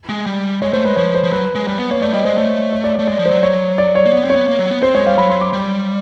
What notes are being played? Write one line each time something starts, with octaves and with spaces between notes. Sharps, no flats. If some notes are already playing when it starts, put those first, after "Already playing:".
G#3
G3
G#3 C#5
A3 C5
G#3 B4
F3 C#5
C5
F3
F#3 B4
G#3
G3 B4
B3
A#3 C#5
A3 D5
G3 D#5
G#3 C5
A3 C#5
C#5
D5
D5
A3
G#3 D5
F3
F#3 C5
C#5
D5
C#5
A#3
B3
C4
C#5
B3
A#3
F#3
B3
C4 C5
G#3 C#5
G3 F5
F#3 B5
C6
D6
G3